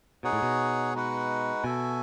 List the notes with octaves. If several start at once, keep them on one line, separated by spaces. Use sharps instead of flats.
B2 D#4 G#4 C#5 F#5
A2
B2
G#3 D#4 F#4 B4 F#5
B2 F#4 A4 E5 G#5